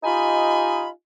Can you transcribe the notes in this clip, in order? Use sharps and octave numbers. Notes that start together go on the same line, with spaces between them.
D#4 F4 G4 D#5 G#5 B5